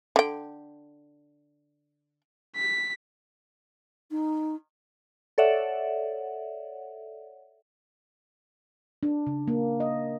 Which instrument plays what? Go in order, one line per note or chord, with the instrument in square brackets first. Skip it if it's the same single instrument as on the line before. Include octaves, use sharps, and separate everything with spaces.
[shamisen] D3 G5
[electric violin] B6
[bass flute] D#4
[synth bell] A4 C#5 D5 E5 F#5
[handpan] D4
C#3
A#3
D#5